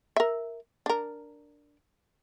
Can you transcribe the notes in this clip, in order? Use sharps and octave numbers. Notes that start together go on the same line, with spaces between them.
A#4 E5
D4 A#4